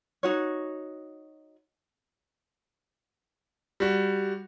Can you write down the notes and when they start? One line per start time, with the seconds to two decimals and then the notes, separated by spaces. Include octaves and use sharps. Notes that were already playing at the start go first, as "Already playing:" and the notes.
0.23 D#4 F#4 C#5
3.80 G3 F#4